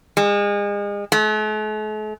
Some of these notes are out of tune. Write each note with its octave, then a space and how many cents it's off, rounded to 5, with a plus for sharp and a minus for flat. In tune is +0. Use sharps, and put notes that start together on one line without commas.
G#3 -35
A3 -45